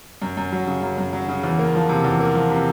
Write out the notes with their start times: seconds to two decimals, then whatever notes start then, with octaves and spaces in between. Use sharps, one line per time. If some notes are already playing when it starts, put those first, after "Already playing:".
0.22 F#2
0.37 F#2
0.52 F#3
0.67 C#3
0.82 F#2
0.98 F#2
1.13 F#3
1.28 C#3
1.43 E2
1.59 A#3
1.74 F3
1.89 C3
2.04 E2
2.20 A#3
2.35 F3
2.50 C3